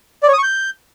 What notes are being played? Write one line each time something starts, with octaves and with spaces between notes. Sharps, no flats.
D5
C#5
D#6
C#6
G6